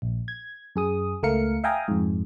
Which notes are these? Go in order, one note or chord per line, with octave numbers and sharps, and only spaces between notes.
A#1
G#6
F#2 G#4 D#6
C#2 A3 A#4 F5 C#7
E5 F5 G5 G#5 A#5 D#6
F2 G#2